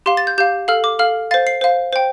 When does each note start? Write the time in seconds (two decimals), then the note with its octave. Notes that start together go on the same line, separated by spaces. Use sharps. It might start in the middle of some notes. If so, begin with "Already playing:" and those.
0.06 G4 F5 C6
0.17 A6
0.27 G6
0.38 G4 F5 G6
0.68 A4 F5 F6
0.84 D6
0.99 A4 F5 F6
1.31 C5 F5 A6
1.47 C7
1.61 C5 F5
1.92 C5 G5